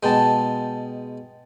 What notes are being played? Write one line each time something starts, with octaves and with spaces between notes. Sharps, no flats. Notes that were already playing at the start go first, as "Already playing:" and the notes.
B2 G#3 G5 A5